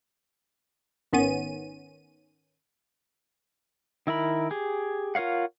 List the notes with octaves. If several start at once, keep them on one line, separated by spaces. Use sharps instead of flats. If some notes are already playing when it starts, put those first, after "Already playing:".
G#1 D#3 B3 C#4 D#7
D#3 E4 A#4 B5
G4 G#4
F4 A#4 C#5 F5 F#5